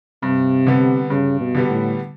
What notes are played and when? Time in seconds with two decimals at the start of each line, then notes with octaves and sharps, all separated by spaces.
0.23 G2 C3
0.67 D3 G3 B3
1.10 G2 C#3
1.40 B2
1.55 D3 G3 B3
1.69 A2